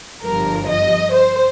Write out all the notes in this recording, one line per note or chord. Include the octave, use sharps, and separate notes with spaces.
G1 G2 F3 A#4
D#5
C5